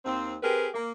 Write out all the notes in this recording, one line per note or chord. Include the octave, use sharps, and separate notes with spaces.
D#2 C4
C4 G4 G#4 A#4 B4
A#3